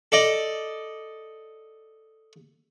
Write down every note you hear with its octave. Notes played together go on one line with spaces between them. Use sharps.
A4 D5 D#5